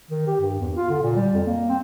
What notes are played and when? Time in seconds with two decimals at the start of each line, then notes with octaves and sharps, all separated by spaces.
0.11 D#3
0.27 G4
0.40 G2
0.60 E2
0.76 F4
0.89 D3
1.02 A#2
1.16 G3
1.34 F2
1.46 A#3
1.69 C4